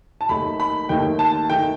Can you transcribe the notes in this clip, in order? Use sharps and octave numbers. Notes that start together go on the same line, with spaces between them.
A5
D#2 D#3 A3 D#4 B5
B5
D#2 D#3 A3 D#4 G5
A5
D#3 A3 D#4 G5